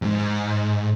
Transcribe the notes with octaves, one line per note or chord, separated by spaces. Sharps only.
E2 G#2